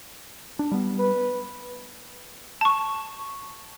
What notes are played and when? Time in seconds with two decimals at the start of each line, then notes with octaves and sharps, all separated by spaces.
0.59 D4
0.71 G3 B3
0.99 B4
2.61 A5 C#6